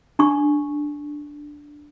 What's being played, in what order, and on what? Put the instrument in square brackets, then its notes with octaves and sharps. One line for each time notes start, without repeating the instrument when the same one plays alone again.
[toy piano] D4 C#6